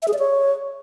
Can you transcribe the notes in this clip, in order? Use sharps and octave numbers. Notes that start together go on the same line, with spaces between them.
E5
G#4
D5
C#5